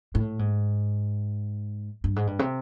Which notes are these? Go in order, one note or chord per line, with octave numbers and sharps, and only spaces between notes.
A2
G#2
G2
G#2
G2
C3